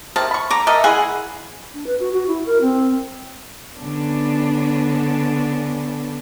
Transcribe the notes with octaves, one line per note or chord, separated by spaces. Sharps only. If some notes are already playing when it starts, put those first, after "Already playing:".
C3 D#3 A#3 A5
B5 C#6
D3 A#5 D6
A3 A#4 D#5
G#3 E4 G#4 F#5 G#5
D4
B4
F#4
F#4
E4
A#4
C4
D3 B3 C#4 D4